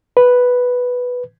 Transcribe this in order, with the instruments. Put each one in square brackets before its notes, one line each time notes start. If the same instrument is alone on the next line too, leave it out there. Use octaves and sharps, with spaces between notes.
[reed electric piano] B4